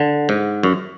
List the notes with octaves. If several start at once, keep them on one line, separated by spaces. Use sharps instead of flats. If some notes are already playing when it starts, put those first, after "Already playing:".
Already playing: D3
G#2
F#2